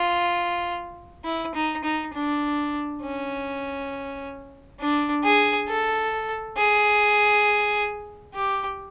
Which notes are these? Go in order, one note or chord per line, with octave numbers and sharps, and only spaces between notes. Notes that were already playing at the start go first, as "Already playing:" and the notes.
Already playing: F4
E4
D#4
D#4
D4
C#4
D4
G#4
A4
G#4
G4